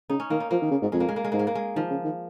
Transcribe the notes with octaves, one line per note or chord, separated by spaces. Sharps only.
C#3 D#4
C#4
D#3 A#3
D#4
F3 A#3
D#3
C#3
G#2
F2 G#3
A#3
G#3
A#3
G#3
G#2 A#3
G#3
A#3
G#3
D#3 F3
C#3
D#3